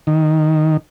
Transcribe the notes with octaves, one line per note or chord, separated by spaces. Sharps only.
D#3